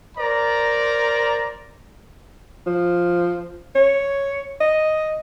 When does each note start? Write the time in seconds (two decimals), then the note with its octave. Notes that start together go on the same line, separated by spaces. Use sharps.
0.18 A#4 C5 D5 A#5
2.67 F3
3.75 C#5
4.61 D#5